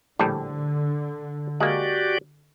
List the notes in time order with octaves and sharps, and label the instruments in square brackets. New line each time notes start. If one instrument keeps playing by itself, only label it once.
[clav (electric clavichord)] A#1 A2 G3 [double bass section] D3
[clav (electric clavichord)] G#3 A#3 [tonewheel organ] F#4 G4 D5